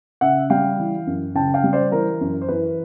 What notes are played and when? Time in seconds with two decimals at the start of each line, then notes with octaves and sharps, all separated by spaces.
0.21 C#3 E5 F#5
0.50 G3 F5 G5
0.78 E3
1.07 F#2
1.35 C#3 G5 A5
1.54 F5 G5
1.64 G3
1.73 C5 D5
1.92 E3 A#4 C5
2.21 F#2
2.41 C5
2.49 E3 B4